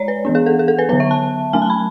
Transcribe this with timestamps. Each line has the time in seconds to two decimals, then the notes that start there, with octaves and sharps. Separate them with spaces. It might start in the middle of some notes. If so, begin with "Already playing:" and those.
Already playing: G#3 C#5 D5
0.08 B4
0.25 E3 B3 D4
0.35 G#4
0.46 A4
0.59 G#4
0.68 A4
0.78 B4
0.89 D3 F#3 B3 B4
1.00 E5
1.11 A5
1.53 F#3 A3 C#4 G#5
1.62 A5
1.70 B5